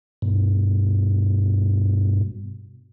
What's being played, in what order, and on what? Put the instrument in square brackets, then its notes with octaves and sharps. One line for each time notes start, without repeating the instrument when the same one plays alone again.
[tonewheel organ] G2 B2